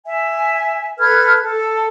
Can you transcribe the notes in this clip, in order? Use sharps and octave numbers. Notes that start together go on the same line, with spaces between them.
E5 G#5
A4 B4 F6 G#6
A4